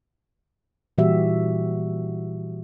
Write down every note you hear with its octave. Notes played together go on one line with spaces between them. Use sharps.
A#2 E3 G3 F#4 G4 E5